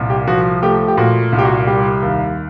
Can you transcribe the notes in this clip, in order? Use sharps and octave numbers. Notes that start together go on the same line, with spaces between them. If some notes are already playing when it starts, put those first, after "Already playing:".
Already playing: C2 A#2
G4
F3 F#4
A3 G4
G4
A#2 F#4
C2
G4
F#4
G3 G4
D#2